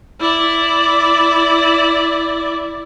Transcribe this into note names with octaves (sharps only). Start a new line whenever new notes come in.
E4 D5